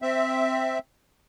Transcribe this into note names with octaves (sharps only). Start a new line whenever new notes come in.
C4 E5